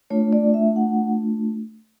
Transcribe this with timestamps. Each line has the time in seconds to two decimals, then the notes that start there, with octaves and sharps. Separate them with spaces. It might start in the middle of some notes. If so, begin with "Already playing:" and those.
0.10 A3 D4 F4 C#5
0.33 D5
0.54 E5
0.76 F#5